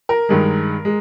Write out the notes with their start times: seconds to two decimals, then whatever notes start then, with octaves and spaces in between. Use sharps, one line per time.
0.09 A#4
0.29 G2 D#3 G#3
0.85 G#3